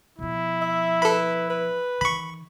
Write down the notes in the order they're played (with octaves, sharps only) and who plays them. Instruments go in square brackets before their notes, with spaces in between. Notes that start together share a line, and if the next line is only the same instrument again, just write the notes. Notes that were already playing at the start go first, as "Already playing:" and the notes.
[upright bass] B2 F3 [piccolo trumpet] E4
[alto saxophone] E5
[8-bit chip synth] A4 B5 [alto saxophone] B4
[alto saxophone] B4
[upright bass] D#3 E3 [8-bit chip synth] B5 C#6